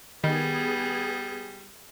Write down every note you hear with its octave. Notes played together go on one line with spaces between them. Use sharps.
D#3 G3 B3 G#4